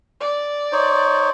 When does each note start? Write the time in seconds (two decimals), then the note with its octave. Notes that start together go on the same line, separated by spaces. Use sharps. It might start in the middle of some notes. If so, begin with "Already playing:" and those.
0.20 D5
0.72 D#4 C5 C#5